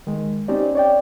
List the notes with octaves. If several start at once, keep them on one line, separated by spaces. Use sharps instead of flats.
D#3 G#3
C4 C#4 D#4 G4 D5
C#5 D5 G5